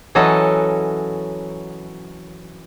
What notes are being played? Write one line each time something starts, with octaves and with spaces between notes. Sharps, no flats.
E3 F#3 C#4 A4 D#5